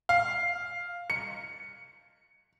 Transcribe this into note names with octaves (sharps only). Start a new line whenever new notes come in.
F5
C#7